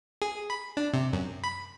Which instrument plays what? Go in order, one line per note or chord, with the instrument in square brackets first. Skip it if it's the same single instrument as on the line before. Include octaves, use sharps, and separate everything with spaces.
[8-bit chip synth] G#4
B5
D4
C3
F#2
B5